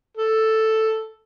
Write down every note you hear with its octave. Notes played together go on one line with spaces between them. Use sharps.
A4